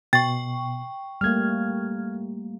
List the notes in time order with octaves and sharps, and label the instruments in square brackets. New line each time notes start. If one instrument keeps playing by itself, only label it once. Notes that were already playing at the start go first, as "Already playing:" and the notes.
[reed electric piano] B2 [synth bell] G5 C#6 [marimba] A6
[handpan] G3 A3 A#3 [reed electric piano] F6 G#6